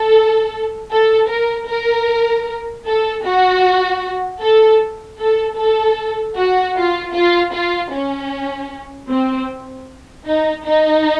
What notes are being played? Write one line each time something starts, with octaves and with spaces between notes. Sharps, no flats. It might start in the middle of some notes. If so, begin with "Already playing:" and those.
Already playing: A4
A4
A#4
A#4
A4
F#4
A4
A4
A4
F#4
F4
F4
F4
C#4
C4
D#4
D#4